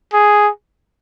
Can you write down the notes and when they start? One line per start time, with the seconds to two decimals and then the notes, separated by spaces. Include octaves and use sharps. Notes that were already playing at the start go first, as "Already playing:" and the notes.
0.13 G#4